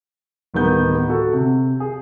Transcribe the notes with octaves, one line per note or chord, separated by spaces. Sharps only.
D1 D#3 G3 B3 G6
F#4 A4
C3
G#4